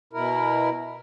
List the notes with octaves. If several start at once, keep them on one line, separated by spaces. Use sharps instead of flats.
B2 E4 A#4